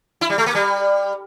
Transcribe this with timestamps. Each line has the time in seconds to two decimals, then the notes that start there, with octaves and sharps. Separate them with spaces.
0.21 E4
0.30 G3
0.38 A3
0.46 A#3
0.55 G3